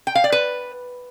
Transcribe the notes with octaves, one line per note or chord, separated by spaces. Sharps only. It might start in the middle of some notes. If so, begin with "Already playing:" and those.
G5
F5
D5
B4